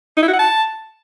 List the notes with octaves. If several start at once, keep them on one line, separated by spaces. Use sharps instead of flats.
D#4
E4
F#4
F#5
A5